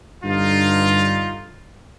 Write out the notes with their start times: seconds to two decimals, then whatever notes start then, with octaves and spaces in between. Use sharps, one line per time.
0.24 G2 D3 D#4 F4